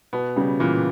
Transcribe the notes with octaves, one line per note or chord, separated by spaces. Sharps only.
B2 B3
C#3 G3
A#2 E3